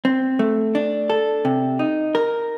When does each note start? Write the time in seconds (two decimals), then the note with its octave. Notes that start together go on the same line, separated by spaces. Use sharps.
0.05 C4
0.39 A3
0.75 D4
1.10 A4
1.45 C3
1.79 D#4
2.15 A#4